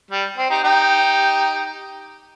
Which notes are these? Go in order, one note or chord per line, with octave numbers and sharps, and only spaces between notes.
G3
C4
D#4 G4
D#4 G4